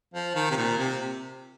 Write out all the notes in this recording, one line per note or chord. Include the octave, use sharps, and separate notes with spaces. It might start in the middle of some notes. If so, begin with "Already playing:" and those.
F3
D#3
C3
A#2
C3